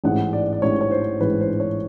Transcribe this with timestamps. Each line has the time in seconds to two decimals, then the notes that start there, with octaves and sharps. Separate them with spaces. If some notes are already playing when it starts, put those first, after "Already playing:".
0.04 A1 G#2 E3 G#3 F#5
0.33 D5
0.53 D5
0.62 A1 G#2 E3 G#3 C#5
0.81 C#5
0.91 C5
1.21 A1 G#2 E3 G#3 B4
1.41 C5
1.60 C#5